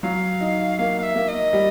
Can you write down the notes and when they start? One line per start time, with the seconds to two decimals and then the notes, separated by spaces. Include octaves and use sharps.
0.03 F#3 F5
0.41 D#4
0.78 A#3 F5
0.99 F5
1.03 E5
1.15 A#3
1.28 D#5
1.53 G3